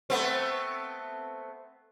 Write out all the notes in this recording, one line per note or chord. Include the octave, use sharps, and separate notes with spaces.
A3 B3 C4